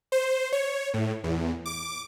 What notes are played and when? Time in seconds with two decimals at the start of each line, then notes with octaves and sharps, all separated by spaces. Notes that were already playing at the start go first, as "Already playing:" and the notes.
0.12 C5
0.52 C#5
0.94 A2
1.24 E2
1.66 D6